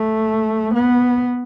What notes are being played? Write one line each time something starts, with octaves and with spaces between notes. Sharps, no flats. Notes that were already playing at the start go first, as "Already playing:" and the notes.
Already playing: A3
B3